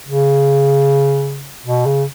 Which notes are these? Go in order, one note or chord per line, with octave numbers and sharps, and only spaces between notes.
C#3
B2
C#3